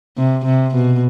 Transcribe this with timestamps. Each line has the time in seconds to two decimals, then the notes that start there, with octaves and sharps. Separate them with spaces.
0.17 C3
0.45 C3
0.74 B2